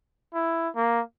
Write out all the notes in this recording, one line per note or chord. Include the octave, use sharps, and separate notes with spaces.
E4
A#3